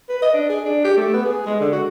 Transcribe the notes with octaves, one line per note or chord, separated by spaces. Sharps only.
B4
D#5
D4
G#4
D4
G4
A3
B3
G#4
G#3
D3
F#4